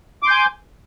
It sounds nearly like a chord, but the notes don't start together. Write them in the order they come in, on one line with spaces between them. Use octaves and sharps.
D6 C6 G6 G#5